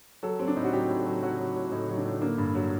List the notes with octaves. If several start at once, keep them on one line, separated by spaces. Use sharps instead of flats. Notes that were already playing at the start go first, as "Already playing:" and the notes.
F#3 A4
F#3 C4
D4
A2 D#4
F#4
F#3 G4
A2
F#3
F#3 F#4
F#3
A2
A2 D#4
F#3
D4
A2
D3 A#3
G2
F#3